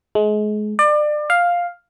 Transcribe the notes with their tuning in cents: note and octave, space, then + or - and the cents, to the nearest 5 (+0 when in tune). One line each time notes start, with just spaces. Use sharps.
G#3 +30
D5 +30
F5 +5